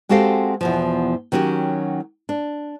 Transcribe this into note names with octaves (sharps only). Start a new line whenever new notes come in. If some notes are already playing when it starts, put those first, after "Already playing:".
G#3 C4 F#4 G4 A4 F5
E2 B2 F3
D#3 F#3 C#4 F#4 G4
D4